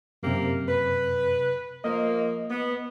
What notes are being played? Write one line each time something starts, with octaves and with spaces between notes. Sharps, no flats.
F#2 C3 A#3 C4 G4
B4
F3 A#3 D#5
B3